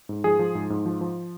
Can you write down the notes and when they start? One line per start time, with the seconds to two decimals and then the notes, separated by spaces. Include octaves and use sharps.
0.09 G#2
0.24 F3 G#4
0.39 F3
0.55 G#2
0.70 G#2
0.86 F3
1.01 F3